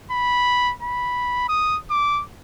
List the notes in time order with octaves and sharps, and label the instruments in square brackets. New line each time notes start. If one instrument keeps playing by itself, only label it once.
[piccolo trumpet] B5
B5
D#6
D6